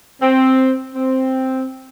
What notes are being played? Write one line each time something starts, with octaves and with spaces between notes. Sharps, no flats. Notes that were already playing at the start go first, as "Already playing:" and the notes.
C4
C4